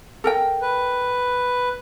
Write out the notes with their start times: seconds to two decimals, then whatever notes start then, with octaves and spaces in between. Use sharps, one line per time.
0.24 A4 A#4 G5
0.62 B4